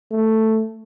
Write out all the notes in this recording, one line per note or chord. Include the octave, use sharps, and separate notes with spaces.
A3